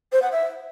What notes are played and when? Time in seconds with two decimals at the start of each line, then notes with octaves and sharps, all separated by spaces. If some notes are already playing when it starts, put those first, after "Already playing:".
0.12 C5
0.22 F#5
0.31 E5